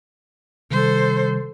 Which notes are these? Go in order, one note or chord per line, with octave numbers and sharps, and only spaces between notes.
C3 D#3 G3 A4 C5